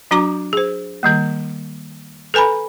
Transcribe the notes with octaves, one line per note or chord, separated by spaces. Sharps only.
F#3 D4 F#4 A#5 D6
G#4 C5
D#3 G3 A#3
A4 B4 G#5 A#5 B5